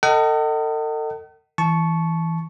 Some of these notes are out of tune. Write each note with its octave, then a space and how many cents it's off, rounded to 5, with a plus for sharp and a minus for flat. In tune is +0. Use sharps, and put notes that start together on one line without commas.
A4 +40 D#5 +0 F#5 +45
E3 +0 A5 -20 C#6 +0